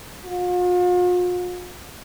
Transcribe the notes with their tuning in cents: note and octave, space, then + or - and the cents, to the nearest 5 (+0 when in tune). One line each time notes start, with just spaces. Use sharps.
F4 +45